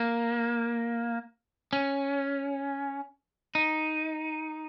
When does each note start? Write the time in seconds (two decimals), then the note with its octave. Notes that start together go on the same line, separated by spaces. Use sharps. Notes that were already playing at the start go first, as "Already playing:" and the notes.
Already playing: A#3
1.73 C#4
3.55 D#4